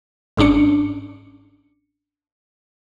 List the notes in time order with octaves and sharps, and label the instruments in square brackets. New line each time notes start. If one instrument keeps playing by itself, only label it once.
[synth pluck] G1 G#2 C#4 D4 C#7